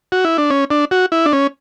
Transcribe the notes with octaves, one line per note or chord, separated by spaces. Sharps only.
F#4
E4
D4
C#4
D4
F#4
E4
D4
C#4